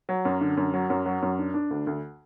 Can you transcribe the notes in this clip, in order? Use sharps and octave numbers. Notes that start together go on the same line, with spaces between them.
F#3
F#2
D3
F#2
F#3
F#2
F#3
F#2
D4
D4
D2
D2